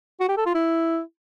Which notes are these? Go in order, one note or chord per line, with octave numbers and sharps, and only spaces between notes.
F#4
G4
A4
F4
E4